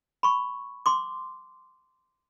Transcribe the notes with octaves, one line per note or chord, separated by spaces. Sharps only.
B5 C#6
C6 D6